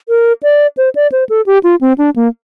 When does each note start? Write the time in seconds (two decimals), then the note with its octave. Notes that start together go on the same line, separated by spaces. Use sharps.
0.09 A#4
0.43 D5
0.77 C5
0.95 D5
1.12 C5
1.29 A4
1.46 G4
1.64 F4
1.81 C4
1.98 D4
2.16 A#3